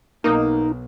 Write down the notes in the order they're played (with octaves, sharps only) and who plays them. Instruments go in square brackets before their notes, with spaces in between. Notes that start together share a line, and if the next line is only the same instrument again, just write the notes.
[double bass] B1 [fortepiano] A#3 D#6 [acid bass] D#4